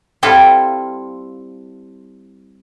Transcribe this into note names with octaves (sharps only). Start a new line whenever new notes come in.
G3 C4 E4 F4 A4